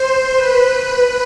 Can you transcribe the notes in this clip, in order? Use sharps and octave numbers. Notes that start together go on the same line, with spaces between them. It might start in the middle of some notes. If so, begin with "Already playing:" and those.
Already playing: C5
B4